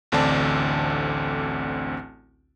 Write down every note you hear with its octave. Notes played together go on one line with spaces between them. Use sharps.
A1 D2 D3 C4 D5 A5